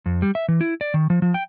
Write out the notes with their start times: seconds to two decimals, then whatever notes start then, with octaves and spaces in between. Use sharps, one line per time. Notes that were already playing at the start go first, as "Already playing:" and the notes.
0.06 F2
0.22 G3
0.35 E5
0.48 E3
0.61 E4
0.81 D5
0.94 D#3
1.10 F3
1.22 F3
1.34 G5